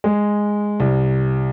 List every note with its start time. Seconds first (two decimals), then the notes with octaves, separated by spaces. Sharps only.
0.04 G#3
0.80 C2